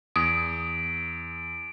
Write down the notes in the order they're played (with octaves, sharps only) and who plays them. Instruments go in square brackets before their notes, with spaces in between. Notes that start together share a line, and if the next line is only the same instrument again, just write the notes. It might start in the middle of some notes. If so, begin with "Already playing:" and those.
[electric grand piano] E2 [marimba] D#6 [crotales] D7